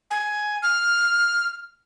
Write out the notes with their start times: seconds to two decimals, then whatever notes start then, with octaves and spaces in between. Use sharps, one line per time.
0.11 G#5
0.63 F6